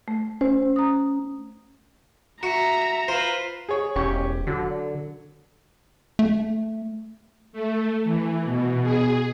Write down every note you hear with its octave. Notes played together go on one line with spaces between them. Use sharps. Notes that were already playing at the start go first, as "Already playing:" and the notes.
A3
C#4 C5
A#5 D#6
F#4 E5 A#5
F4 B4 C5
G#4 C#5
E1 C#4 G4 C#6
D3 F#3
A3
A3
E3
B2
G#4